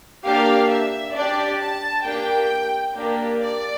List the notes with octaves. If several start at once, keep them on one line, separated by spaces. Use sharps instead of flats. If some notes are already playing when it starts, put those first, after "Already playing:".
A#3 D4 G4 F5
E5
D4 G4 D5
A5
A#3 D4 G4 G5
A#3 D4 G4
D5